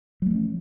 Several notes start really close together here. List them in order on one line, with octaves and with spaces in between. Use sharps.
F#3 A3 F3 C#4